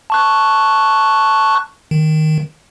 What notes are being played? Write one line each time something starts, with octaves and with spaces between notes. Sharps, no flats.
A5 C#6 F#6
D#3